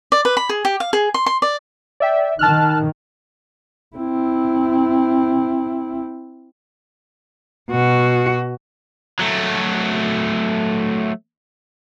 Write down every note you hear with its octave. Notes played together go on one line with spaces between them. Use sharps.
D5
B4
B5
G#4
G4
F5
G#4
C6
C6
D5
D5 E5 G5
D#3 A5 F6 F#6
C4 E4
B2 F#4
F#3 A3